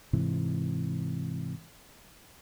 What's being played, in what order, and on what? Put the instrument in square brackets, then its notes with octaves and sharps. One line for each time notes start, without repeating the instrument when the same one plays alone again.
[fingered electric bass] G#2 C3 E3